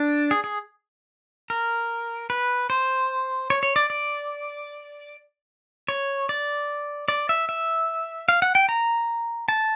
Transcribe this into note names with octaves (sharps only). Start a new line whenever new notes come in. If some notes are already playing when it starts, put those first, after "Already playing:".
Already playing: D4
G#4
G#4
A#4
B4
C5
C#5
C#5
D5
D5
C#5
D5
D5
E5
E5
F5
F#5
G5
A#5
A5